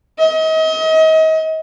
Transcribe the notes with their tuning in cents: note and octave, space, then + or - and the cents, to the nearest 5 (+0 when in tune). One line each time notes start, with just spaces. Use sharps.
D#5 +35